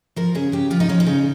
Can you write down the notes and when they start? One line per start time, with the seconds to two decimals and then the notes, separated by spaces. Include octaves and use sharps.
0.16 F3 A#4
0.35 C#3 G#4
0.52 C#3 G4
0.70 F3 F4
0.80 D#4
0.89 F3 C#4
1.00 D#4
1.06 C#3